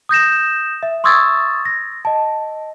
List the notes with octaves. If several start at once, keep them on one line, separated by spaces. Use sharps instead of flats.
D#6 G6 A#6 E7
E5
C6 C#6 D#6 E6 G#6 A6
A#6
D#5 A5